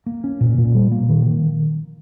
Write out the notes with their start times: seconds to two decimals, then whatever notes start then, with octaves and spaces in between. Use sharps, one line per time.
0.06 A#3
0.24 C#4
0.41 A#2
0.58 A#2
0.75 G3
0.92 A#3
1.09 D#3
1.26 D#3